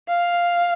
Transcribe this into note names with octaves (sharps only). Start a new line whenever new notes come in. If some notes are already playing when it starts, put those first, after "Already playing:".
F5